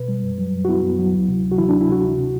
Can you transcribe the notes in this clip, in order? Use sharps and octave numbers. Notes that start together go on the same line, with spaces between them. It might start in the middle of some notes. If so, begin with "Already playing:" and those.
Already playing: B2 B4
G3
F#2
F#3
F#2
F#4
B3 E4
F#2
F#3
D2
C3
D2
F#4
E3 E4
D2 D4
E4
C3 F#4
D2
C3